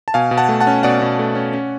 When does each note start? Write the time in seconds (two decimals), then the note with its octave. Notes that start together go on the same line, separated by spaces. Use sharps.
0.08 A5
0.14 B2 F5 G#5
0.31 B2
0.38 F#5 A5
0.49 A3
0.61 F#5 A5
0.67 C#4
0.83 B2 D5 F#5
1.02 B2
1.19 A3
1.35 C#4
1.53 C#4